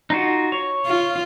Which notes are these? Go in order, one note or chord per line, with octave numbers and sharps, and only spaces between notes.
D#4 F4 F#4
C#5
F4